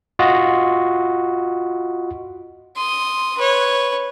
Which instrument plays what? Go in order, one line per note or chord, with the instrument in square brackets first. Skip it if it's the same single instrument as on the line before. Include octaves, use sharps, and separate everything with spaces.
[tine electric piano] F4 F#4 D#5
[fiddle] C6 D#6
B4 C#5